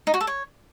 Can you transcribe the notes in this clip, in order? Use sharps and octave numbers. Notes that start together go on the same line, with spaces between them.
D#4
F#4
A4
C#5